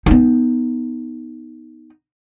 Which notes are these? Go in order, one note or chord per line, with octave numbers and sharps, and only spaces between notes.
B3 D#4